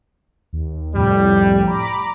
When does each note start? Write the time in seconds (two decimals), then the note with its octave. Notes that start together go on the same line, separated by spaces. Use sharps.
0.53 D#2
0.95 C2 F2 A2 G3
1.67 A#5 B5 D6